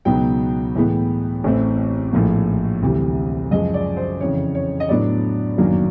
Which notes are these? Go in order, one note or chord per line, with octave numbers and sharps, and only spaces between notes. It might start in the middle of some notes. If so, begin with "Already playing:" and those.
C#2 B2 F#3 B3 D#4 G5
A2 E3 G#3 B3
A1 A2 E3 A3 C4
A#1 A2 F3 A#3
D2 C3 E3 G3
F#2 C#3 F3 G#3 D#5
D5
C5
F2 C#3 E3 C#5
C#5
D#5
A2 F#3 B3 D4 D5
G1 F#2 D#3 F#3 A#3